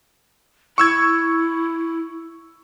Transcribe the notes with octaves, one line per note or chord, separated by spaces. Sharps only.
E4 C#6 E6 G#6